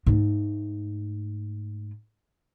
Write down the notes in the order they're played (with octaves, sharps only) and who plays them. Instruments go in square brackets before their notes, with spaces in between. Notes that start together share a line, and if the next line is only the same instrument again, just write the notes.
[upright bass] G#2 A3